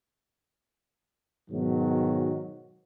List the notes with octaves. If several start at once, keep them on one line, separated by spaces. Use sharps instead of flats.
G#2 B2 D#3 F#3